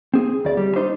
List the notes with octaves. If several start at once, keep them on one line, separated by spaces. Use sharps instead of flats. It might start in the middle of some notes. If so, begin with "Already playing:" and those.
C4 G#4
D2 D5
G3
D4 D#4 C5